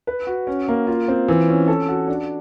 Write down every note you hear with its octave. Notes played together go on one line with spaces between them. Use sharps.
B4
F#4
C#4
A#3
F4
C4
E3
C#4
A4
F#4
D4